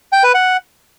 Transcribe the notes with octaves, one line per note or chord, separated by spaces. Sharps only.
G5
B4
F#5